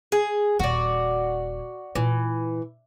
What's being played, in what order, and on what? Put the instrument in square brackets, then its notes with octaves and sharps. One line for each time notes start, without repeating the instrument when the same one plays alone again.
[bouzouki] G#4
[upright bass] D#1 E4 [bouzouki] F#4 D5
[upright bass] A#2 [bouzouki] E3